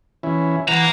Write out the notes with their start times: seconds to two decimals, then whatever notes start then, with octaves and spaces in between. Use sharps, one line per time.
0.23 E3 C#4 E4
0.68 E3 A#3 F#5 A#5